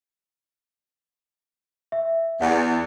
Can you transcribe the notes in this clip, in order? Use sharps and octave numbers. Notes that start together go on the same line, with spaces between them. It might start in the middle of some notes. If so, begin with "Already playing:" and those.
E5
E2 D5 F#5